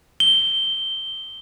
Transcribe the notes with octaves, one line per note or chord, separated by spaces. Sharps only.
G7